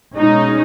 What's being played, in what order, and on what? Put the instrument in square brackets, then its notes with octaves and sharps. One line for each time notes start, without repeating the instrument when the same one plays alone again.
[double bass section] B2 G#3 C#4 [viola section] D#4